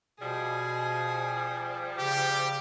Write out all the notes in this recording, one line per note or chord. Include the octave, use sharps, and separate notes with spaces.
B2 F3 G3 G#4
C#3 G4